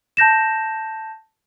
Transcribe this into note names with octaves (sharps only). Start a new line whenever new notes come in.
A5 G6 A#6 E7